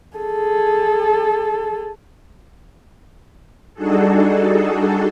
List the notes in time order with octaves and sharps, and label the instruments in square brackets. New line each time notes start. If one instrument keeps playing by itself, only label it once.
[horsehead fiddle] G#4 A4
[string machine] G3 D4 D#4 F#4 G#4 A4